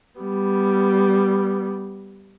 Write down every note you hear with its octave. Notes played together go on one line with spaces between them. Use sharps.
G3 B3